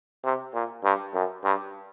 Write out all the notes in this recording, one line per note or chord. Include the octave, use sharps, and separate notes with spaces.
C3
A#2
G2
F#2
G2